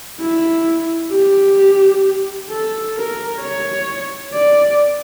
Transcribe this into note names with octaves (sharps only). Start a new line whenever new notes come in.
E4
G4
A4
A#4
C#5
D5